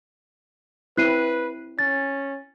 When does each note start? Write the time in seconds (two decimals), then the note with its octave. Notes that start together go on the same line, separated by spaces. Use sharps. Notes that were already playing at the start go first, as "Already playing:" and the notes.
0.98 C4 E4 B4 F#6 C7 D#7
1.79 C#4 A6